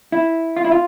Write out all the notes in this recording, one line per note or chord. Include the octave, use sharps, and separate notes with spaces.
E4
F4
E4
F4